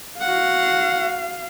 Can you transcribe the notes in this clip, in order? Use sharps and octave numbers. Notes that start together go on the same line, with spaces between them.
F#4 F5 F#5